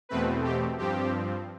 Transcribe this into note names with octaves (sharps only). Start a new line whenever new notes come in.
E2 B2 A3 C4 B4
G4
G2 F3 C4 G4